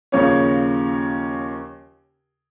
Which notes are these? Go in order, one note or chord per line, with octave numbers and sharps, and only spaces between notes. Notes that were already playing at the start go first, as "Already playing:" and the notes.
D#2 C#3 F3 C#4 C#5